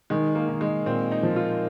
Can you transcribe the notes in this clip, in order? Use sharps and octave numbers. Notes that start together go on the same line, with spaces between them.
D#3 G#3
A#3
D#3
G#3
A#2 C4
D#4
F3
F4